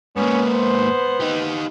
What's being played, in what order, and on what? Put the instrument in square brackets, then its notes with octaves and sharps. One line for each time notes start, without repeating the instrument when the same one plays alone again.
[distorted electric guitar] G#2 A#3 [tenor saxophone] B3 [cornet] C#4
[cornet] C5
[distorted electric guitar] D#4 G4